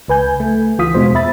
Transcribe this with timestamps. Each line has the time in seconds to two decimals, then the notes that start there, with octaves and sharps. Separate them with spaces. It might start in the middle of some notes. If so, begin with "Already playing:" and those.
0.08 C#2 B4 G#5 G6
0.40 A3
0.78 C#2 E3 F4 F5 D#6 B6
0.94 E2 B2 G#3 C5
1.15 E5 B5 A6